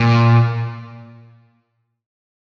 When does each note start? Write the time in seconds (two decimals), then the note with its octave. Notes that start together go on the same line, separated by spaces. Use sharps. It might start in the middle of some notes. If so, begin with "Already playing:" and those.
Already playing: A#2